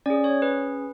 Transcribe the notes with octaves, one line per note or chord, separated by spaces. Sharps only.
C#4 G#4 D5
C#5
B4